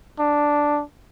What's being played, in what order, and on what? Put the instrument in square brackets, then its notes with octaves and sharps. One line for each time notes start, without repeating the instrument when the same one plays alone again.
[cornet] D4